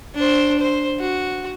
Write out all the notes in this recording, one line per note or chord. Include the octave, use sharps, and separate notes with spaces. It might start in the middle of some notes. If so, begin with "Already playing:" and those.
D4 C5
C5
F#4